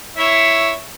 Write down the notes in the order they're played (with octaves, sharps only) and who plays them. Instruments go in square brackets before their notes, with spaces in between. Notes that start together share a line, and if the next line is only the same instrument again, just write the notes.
[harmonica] E4 C#5 E5